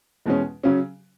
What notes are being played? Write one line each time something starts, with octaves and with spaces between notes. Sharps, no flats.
E2 B2 G#3 C#4
C#3 F#3 C#4